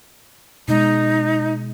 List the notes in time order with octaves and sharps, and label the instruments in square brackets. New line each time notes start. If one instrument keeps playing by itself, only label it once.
[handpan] B2 G#3 [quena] D#4